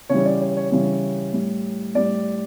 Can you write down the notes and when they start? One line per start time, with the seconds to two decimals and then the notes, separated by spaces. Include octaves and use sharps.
0.09 C#3 E3 G3 C#5
0.26 D5
0.41 C#5
0.57 C#5
0.71 C#3 E3 G3 C#5
1.33 A2 G3
1.94 A2 G3 D5